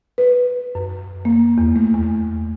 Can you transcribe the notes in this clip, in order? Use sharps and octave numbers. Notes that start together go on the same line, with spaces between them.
B4
F#2
A#3
E2
A3
E2